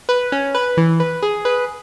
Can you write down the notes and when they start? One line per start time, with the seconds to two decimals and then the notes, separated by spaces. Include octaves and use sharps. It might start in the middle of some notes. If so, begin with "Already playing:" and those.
0.09 B4
0.32 C#4
0.55 B4
0.77 E3
1.00 B4
1.23 G#4
1.45 B4